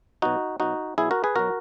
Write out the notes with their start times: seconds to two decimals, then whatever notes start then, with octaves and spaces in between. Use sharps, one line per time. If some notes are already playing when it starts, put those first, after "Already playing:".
0.22 B2 F#3 D#4 F#4
0.60 B2 F#3 D#4 F#4
0.98 B2 F#3 E4 G#4
1.11 F#4 A#4
1.24 G#4 B4
1.35 B2 F#3 F#4 A#4